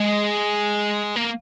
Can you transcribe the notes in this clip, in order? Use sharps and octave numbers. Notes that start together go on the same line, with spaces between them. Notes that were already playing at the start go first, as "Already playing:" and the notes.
Already playing: G#3
A#3